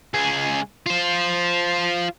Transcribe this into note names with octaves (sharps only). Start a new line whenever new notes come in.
C#2 G#4
F4 C5